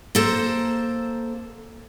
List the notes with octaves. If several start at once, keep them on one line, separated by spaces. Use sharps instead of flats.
A#3 A4 C5 A#5